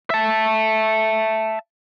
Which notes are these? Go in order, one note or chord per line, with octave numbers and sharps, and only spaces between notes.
E5 A5